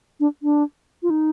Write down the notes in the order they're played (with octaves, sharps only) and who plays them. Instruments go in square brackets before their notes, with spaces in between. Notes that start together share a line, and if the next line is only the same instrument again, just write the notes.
[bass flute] D4
D4
F4
D#4